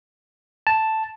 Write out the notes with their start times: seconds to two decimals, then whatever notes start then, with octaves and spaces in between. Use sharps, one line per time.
0.67 A5